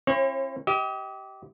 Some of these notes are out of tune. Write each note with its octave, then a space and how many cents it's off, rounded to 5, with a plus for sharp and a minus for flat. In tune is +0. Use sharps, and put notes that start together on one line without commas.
C4 +45 E4 +40 C#5 -35
G4 -20 D#5 +35